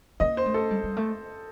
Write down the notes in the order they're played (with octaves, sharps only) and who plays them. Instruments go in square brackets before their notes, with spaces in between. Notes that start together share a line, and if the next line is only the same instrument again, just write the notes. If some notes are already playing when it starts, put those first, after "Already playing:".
[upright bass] A#3 [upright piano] D#5
[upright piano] C5
[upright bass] A3
[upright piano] A4
[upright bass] G3
G3
A3